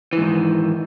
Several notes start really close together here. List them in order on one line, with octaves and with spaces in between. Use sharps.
E3 G#2 D#3